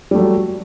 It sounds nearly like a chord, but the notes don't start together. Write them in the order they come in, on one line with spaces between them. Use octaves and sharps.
G3 A3 F#3